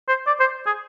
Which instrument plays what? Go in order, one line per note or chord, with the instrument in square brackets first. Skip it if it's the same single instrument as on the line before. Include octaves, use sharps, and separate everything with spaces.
[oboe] C5
D5
C5
G#4